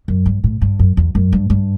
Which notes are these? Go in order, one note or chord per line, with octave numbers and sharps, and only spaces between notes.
F#2
G2
A2
G2
F#2
E2
F#2
G2
G2